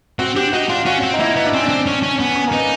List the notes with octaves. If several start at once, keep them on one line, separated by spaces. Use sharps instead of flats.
C4 F#4
D4 G4
D#4 F#4
D4 F4
C#4 F#4
C4
D#4
A#3 E4
B3 D#4
D4
C4 C#4
D4
C4
C#4
C#4
B3 C#4
C#4
A#3
B3 D#4